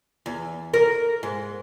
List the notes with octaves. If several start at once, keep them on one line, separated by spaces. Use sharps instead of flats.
E2
A#4
G#2